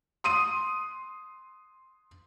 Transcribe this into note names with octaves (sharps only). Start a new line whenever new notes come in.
C6 D#6 D#7